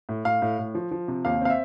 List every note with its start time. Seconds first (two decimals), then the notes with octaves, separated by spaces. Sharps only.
0.09 A2
0.25 A2 F5
0.42 A2
0.59 A2
0.75 F3
0.91 F3
1.08 C3
1.25 D#2 F5
1.42 C4 F5
1.50 E5